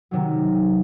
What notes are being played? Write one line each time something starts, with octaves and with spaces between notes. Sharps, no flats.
C3 D#3 F#3